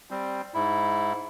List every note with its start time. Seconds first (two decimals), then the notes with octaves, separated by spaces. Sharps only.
0.11 G3 C4
0.54 G#2 E4